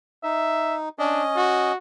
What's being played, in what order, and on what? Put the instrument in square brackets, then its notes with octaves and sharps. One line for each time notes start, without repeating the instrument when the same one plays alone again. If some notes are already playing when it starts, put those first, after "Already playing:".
[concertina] D#4 [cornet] E5
[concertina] C#4 D#5 [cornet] D4
[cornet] F#4